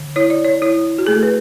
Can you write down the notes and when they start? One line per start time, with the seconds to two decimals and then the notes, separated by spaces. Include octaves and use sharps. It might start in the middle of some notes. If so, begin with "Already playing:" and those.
Already playing: D3
0.16 E4 C#5
0.30 D5
0.45 C#5
0.62 E4 C#5
0.98 F#4
1.07 A3 G#4
1.15 A4
1.23 B4